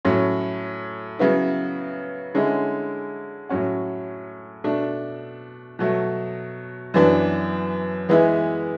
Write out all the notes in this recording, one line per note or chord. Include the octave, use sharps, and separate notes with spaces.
A2 F#3 C#4
C#3 F#3 B3 E4
D3 G#3 C#4 E4
A2 F#3 C#4 F#4
B2 A3 D4
B2 F#3 A3
F#2 E3 B3 D4
E3 G#3 B3 E4